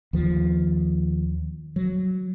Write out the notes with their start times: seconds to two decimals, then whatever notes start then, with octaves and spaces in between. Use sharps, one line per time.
0.13 D#2 F3
1.76 F#3